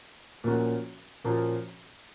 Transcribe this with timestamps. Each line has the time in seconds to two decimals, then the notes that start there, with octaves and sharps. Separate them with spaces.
0.44 A#2 F3 A#3 C#4 F#4
1.24 A#2 F3 A#3 C#4 F#4